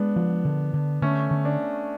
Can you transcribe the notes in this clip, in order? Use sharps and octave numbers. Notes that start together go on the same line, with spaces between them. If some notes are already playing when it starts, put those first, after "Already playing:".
Already playing: G#3 B3 D4
F3
D3
D3
D3 A3 C#4
D3
D4